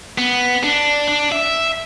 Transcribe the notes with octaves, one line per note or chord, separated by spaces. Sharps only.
B3
D4
D4
E5